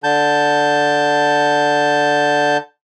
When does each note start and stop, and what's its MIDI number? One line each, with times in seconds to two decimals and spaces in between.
0.04 2.57 50
0.04 2.57 81
0.04 2.57 91